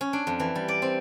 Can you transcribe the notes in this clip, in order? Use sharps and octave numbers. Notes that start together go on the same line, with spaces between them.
C#4
D4
F2
E3
G3
D5
C4